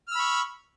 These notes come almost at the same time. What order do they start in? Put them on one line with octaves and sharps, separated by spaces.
F6 E6 B5 C#6